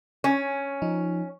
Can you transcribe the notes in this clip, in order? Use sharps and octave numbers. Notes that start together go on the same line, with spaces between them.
C#4 G#5
F3 D#4